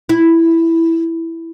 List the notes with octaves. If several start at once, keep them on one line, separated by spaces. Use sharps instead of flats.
E4